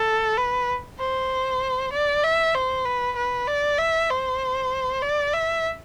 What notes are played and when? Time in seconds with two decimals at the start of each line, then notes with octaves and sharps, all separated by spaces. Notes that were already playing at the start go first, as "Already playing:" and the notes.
Already playing: A4
0.38 B4
1.00 C5
1.93 D5
2.24 E5
2.55 C5
2.85 B4
3.17 B4
3.48 D5
3.79 E5
4.10 C5
5.02 D5
5.33 E5